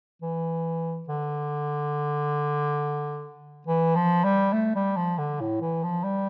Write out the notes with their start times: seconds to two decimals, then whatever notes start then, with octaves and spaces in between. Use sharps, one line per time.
0.22 E3
1.08 D3
3.67 E3
3.96 F3
4.24 G3
4.53 A3
4.75 G3
4.97 F3
5.18 D3
5.40 A2
5.61 E3
5.83 F3
6.04 G3